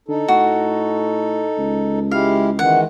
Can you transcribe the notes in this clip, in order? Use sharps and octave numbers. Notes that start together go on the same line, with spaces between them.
D3 D#4 A4
A2 F#4
C#2
G#3 E4 G4 F5
D#3 E3 G#3 F#5